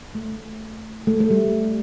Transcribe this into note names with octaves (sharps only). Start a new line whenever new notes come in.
A3
A3
A3
G3